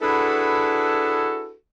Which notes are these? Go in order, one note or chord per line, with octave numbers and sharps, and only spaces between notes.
D4 E4 F#4 G#4 A4 B4